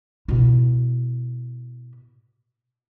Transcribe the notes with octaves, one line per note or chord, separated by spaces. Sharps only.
B2 E4